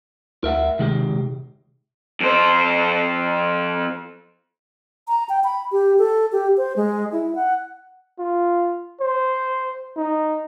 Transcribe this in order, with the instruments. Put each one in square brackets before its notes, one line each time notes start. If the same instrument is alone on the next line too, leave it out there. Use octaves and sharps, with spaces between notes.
[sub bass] D2 [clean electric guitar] A#4 E5 F#5
[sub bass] C3 [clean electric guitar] D#3 G#3 G4
[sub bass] C3
[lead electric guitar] F2 C5
[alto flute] A#5
G5
B5
G4
A4
G4
C5
G#3
E4
F#5
[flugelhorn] F4
C5
D#4